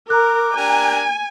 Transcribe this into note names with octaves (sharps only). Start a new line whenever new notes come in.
A#4 A#5 D6 F#6
D4 G4 A#4 G#5